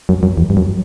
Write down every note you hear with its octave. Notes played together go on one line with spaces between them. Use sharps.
F#2
F#2
E2
G2
F#2